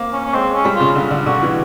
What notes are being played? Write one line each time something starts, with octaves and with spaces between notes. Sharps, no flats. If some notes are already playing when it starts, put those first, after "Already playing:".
Already playing: A#3 C4
C#4
C#4
G#3 C4
C#4
G3
F4
C#3
D3
D3
D3 F#4
E3